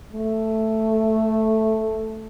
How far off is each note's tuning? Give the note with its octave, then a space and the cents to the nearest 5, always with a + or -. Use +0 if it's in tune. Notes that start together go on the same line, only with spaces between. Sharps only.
A3 +0